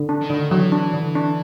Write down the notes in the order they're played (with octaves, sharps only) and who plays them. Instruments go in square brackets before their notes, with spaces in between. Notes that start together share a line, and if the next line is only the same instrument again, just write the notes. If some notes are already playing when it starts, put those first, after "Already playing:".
Already playing: [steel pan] D3
D4
[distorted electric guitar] D#3
[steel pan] D3
[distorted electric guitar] E3 [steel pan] F#3
[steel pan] D4
D3
D4